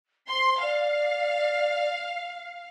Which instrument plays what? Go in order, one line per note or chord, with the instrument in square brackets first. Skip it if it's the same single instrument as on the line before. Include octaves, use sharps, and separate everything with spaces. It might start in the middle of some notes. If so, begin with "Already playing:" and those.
[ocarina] C5 [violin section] C6
[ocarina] D5 [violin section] F5